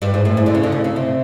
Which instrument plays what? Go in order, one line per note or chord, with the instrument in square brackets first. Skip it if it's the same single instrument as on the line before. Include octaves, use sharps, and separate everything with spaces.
[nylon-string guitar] G2
G#2
A2
G#2
D2 D3
C#3
D2 D3
C#3
C#3
C3